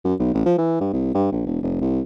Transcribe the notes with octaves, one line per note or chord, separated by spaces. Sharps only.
F#2
B1
A1
F3
E3
G2
C2
G2
A#1
E1
F1
C2